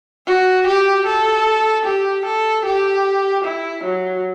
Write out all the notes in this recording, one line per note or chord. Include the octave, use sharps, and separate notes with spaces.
F#4
G4
A4
G4
A4
G4
E4
F#3